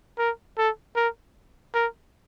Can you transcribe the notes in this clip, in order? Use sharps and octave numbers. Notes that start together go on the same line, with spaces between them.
A#4
A4
A#4
A#4